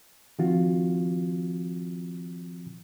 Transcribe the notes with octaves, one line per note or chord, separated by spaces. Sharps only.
D#3 F3 C4 F4 F#4